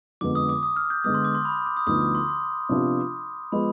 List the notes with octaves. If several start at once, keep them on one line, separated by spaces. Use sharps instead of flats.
F2 D3 G#3 B3 D6
D#6
D6
D#6
F6
G6
D3 G#3 B3 D#6
C6
D6
C6
B5
D6
D#6
D2 D3 F3 B3 D#4 D#6
D6
C6
C6
C3 F3 B3 D4 F4
F3 G#3 B3 B5